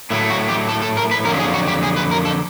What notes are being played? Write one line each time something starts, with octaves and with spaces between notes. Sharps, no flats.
A2 F#3 A3 E4
F#4
G4
A4
A4
A#4
B4
F2 D3 F#3 A#4
G#4
F#4
G4
G#4
B4
A#4
A4